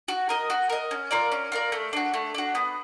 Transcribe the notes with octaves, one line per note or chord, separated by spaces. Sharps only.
F#4
A#4 D#5
F#4
A#4 D#5
C#4
F4 A#4 D5
C#4
F4 A#4 D5
A3
D4 F#4
A3
D4 F#4
B3